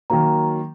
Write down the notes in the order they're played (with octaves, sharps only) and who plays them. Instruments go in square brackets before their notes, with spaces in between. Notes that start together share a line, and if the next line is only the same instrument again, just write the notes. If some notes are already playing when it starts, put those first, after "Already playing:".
[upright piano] D#3 F#3 A#3 [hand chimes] A#5